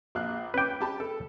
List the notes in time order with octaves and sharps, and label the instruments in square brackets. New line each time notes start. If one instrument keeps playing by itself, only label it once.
[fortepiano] A#1 F5 F#6
[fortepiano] C#4 D6 [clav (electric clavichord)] B4 G5
[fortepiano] G4 A5 B5
A4